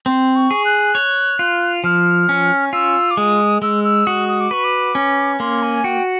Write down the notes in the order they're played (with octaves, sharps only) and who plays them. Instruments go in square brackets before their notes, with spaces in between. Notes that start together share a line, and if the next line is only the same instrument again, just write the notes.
[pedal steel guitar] C4 [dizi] C6
[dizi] C#6
[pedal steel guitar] G#4
[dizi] F#6
[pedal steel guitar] C#5
F4
[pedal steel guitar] F3 [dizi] F6
[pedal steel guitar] C#4
[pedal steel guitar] F4 [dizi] E6
[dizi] D6
[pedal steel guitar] G#3 [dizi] D#6
[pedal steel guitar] G#3 [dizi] E6
[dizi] E6
[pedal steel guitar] F#4 [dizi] D#6
[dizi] D#6
D6
[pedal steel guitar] B4 [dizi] C#6
[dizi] D6
[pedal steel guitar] C#4
[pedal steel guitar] A#3 [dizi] C6
[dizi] G#5
[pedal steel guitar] F#4 [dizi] G5